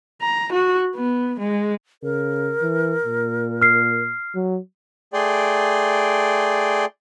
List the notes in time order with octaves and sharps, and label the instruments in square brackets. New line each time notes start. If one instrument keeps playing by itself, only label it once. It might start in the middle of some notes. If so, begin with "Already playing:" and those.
[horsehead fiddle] A#5
F#4
B3
G#3
[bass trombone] C#3 [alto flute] A#4
[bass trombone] E3
A#2
[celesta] F6 C7
[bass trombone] F#3
[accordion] A3 G#4 D5 G5 C6